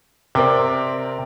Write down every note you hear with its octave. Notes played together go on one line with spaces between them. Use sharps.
C3 C4 A#4 D5